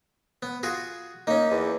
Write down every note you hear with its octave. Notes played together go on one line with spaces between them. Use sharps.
B3
F4 F#4 G#4
A#3 C#4 D#4
E2